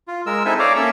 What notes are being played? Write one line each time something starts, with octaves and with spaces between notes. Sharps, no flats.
F4
G#3 A#4 E6
C4 D#4 E4 A4 E5 G#5
C#5 D5 F5 G#5 A#5 D6
A#3 C#4 A4 E5 E6